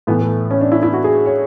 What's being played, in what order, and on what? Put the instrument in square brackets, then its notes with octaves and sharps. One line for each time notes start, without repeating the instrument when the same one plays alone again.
[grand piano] A2 E3 B3
A3
C#4
D4
E4
E4
F#4
G#4
C#5